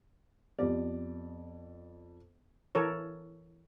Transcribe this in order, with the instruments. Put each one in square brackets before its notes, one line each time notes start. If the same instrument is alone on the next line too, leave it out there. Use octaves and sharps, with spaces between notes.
[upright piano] F2 D5 [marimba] B3 G4
[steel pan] E3 A4 A#4 C#5